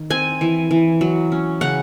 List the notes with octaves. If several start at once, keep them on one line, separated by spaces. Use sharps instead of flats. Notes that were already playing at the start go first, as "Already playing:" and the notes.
Already playing: D#3
C4 G#5
E3
E3
F#3
C#4
C#3 F#5